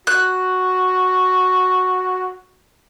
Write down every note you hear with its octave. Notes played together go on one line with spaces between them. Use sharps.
F#4 F#6